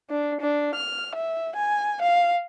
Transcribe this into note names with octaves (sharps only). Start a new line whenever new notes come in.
D4
D4
F6
E5
G#5
F5